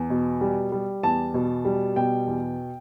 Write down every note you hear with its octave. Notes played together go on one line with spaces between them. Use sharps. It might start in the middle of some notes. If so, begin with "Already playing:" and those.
Already playing: E2
B2
G3
G3
E2 A5
B2
G3
B2 G5
E2